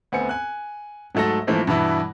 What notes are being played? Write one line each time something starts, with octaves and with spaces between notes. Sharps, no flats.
D2 B3 C4 G#5 C#7
G#5 F#6
G#2 F#3 A3 A4 A#6
G#2 E3 F3 A3 A#3 C4
G2 B2 E3 E4